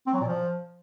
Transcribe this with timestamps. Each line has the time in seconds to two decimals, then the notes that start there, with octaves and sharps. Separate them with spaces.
0.07 C4
0.14 F#3
0.21 A#2
0.28 F3